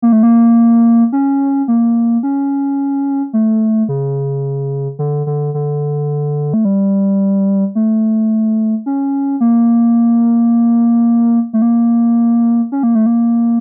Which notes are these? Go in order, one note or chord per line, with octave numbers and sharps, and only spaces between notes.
A#3
A3
A#3
C#4
A#3
C#4
A3
C#3
D3
D3
D3
A3
G3
A3
C#4
A#3
A3
A#3
C#4
A#3
A3
A#3